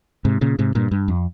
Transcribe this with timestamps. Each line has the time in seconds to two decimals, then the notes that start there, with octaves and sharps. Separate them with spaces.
0.25 G#2 C3
0.41 A#2 C#3
0.59 G#2 C3
0.75 G2 A#2
0.91 G2
1.08 F2